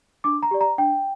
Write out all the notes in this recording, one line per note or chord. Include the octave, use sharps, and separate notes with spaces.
D4 D6
A#5
G4 D5
A#5
D4 G5